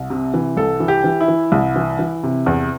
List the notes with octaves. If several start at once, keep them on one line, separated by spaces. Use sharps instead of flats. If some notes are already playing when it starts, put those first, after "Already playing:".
Already playing: C2
C3
E3
C2 A4
E3
G4
E3
E4
E3
C2
E3
E3
C3
E2